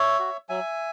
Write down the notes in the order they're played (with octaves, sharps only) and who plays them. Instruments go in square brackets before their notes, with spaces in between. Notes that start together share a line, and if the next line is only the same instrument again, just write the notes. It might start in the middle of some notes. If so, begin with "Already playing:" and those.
Already playing: [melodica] C#5 E5
F#4
F#3 E5 G#5